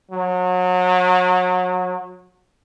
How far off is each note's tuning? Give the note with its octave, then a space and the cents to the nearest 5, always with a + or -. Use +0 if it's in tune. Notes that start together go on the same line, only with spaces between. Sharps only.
F#3 -30